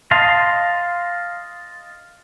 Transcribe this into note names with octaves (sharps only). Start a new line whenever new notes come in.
D#5 F5 A5 C6